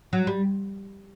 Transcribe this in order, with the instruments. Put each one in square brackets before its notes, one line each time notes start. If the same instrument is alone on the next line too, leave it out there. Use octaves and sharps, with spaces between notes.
[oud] F#3
G3